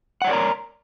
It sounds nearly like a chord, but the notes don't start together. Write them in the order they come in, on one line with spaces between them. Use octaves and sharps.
F#5 C#5 D5 A#4 A#5